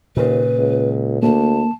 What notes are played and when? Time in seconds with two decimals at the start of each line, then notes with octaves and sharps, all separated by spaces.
0.17 D#2 A#2 C#3 B4
0.58 C#2
1.23 D2 A#3 A5